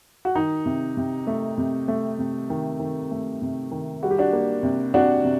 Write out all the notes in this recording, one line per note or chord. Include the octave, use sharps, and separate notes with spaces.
F#4
D#3 D#4
C3
C3
A3
C3
A3
C3
D#3
D#3
A3
C3
D#3
G3 F#4
G4
D4 F#4
A#3
C3
C3 D4 F#4
C3